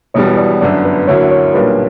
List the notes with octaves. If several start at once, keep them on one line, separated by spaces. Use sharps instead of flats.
E1 E2 B2 G3 B3 C#5
D5
G1 F#2 D3 D5
B4
D2 D3 F#3 A#3 E4 C#5
C#5
B1 A#2 G3 A#3 D4 B4